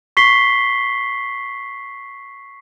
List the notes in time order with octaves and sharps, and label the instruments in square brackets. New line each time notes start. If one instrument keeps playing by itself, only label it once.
[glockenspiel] C#6 B6 C7 G7